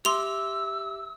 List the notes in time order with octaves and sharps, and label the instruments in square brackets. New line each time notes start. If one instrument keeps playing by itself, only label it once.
[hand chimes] G4 E5 D6 [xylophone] C6 F7 [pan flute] E6